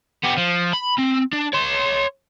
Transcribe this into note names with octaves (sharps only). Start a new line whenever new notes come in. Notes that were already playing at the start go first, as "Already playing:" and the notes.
B3 G4
F3
B5
C4
D4
C#5 C6